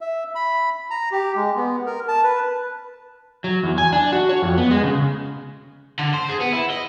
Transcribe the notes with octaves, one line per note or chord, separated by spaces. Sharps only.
E5
B5
A#5
G4
G#3
B3
A#4
A5
B4
F#3
E2
G#5
D4
F#4
C#5
F2
B3
G#3
C#3
D3
C5
G#4
B3
E4
D#5